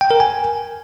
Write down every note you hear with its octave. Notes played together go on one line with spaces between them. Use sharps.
G5
A#4
G#5